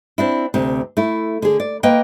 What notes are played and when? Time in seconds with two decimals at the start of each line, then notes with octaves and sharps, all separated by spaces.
0.18 C4 D4 E4
0.54 D2 C3 C4
0.97 A3 E4
1.42 D3 G#4
1.60 D5
1.83 A#3 B4 D#5 G5